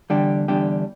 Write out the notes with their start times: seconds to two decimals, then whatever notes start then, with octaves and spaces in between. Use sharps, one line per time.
0.10 E2 D3 G3 D4 G4
0.48 E2 D3 G3 D4 G4